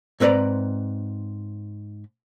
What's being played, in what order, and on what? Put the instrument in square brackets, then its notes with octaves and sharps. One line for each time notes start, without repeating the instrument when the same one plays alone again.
[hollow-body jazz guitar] G#2 C4 B4 D5 A#5 B5